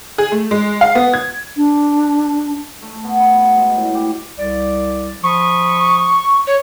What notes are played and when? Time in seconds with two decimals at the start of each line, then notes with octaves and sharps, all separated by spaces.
0.18 G#4
0.32 A3
0.51 G#3
0.81 F5
0.95 B3
1.14 G#6
1.57 D4
2.83 A3
3.04 B3
3.20 B5
3.34 B2
3.57 G#3
3.77 A2
3.95 G4
4.39 C2 D5
5.23 F3 B5 C#6 D#6
6.47 C#5